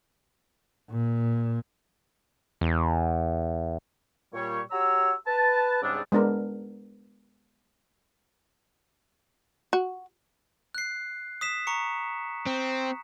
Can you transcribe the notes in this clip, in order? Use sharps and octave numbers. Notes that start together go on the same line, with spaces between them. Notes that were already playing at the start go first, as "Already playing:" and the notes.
A#2
E2
A#2 G3 C#5 C#6
F#4 G4 C#5 A#5 E6
B4 A5
G#2 C#3 G3 B3 C4 D4
G#3 B3 D4 A#4
F#4
F#6 C7
D#6 B6 E7
A#5 C#6 C#7
C4